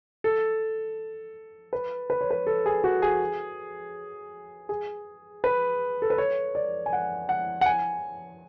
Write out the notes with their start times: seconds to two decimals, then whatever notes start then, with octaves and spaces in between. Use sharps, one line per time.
0.24 A4
1.73 B4
2.10 B4
2.21 C#5
2.31 B4
2.47 A4
2.66 G#4
2.84 F#4
3.02 G#4
4.69 G#4
5.44 B4
6.02 A4
6.10 B4
6.18 C#5
6.55 D5
6.86 G#5
6.93 F#5
7.29 F#5
7.61 F#5
7.66 G#5